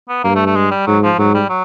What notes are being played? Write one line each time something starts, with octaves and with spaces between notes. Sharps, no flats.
B3
G2 A#3
A3
A3
G#3
G3
G#2 F#3
F3
G#2 F#3
G3
F#3